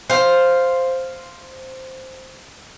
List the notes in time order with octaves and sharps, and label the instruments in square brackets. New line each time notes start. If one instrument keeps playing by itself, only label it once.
[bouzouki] C5 F5